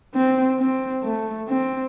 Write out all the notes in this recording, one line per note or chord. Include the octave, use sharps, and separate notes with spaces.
C4
C4
A3
C4